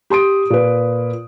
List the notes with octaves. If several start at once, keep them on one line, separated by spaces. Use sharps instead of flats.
G4 C6 D#6 D7
A#2 B4